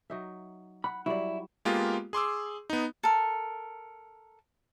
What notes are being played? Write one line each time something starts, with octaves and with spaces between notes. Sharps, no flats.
F#3 D#4 E5
F#5 B5
F#3 G3 E4 D5
G#3 A#3 B3 F4 G4
G#4 C6 D6 E6
B3 D#4
A4 A#4